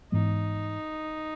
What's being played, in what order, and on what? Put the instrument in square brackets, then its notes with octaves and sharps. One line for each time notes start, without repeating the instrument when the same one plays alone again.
[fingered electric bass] G#2 E3 G#3 B3 [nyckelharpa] D#4